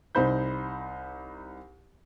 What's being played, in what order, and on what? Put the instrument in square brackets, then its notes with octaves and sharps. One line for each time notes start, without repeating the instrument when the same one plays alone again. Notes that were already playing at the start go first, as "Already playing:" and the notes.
[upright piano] C2 D#4 C5 B5 G6